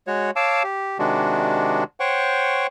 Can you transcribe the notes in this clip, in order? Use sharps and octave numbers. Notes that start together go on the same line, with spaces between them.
G#3 F#4 C#5
C#5 F5 A5 D6 E6
G4
C3 D#3 G#3 D4 F#4
C5 C#5 F#5 G5 C#6